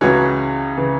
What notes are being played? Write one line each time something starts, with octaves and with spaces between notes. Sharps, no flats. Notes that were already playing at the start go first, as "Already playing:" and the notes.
C#2 C#3 E3 C#4 F#4
C#3 E3